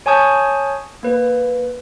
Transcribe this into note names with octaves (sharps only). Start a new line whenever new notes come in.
C#5 G#5 A5 C#6 D#6 G6
A#3 B4